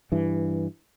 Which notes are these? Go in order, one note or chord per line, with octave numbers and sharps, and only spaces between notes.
G2 E3